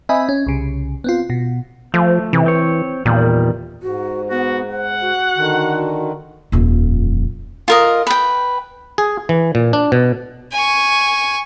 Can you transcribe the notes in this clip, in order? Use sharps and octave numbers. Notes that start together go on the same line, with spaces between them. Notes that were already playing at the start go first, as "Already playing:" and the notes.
C4 D#5 E5 G#5 B5
C#4
C2 C#3
B3 C4 F4
B2
F3 A3
C3 E3
C4 C#5
E2 A#2 D#3 G3
G#2 F#4
B3 F#4
C5 F#5
F#4
D3 D#3
D#1 F2
F4 A#4 D#5
B4 G5
G#4
E3
A#2
D4
B2
G#5 C#6